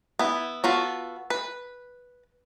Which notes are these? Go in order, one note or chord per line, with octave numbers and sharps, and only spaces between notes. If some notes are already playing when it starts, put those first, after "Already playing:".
B3 E4
B3 F4 F#4 A4
B4